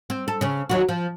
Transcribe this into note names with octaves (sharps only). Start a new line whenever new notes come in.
C4
A4
C#3 C#4
D#2 F#3 F#4
F3